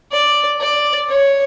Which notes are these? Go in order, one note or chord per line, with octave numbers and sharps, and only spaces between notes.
D5
D5
C#5